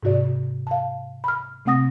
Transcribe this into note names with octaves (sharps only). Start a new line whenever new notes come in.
G#2 C3 F#4 D5
F5 A5
B5 F6
C3 A3 C4 F#5 D#6 A#6